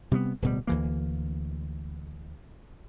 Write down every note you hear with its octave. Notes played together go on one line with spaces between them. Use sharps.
C3 G3 G#3 B3
D1 B2 G3
D2 E3 A#3